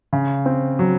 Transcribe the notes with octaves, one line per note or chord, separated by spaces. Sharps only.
C#3
C4
F#3